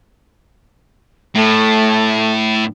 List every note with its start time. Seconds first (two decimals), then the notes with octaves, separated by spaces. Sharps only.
1.35 A2 A3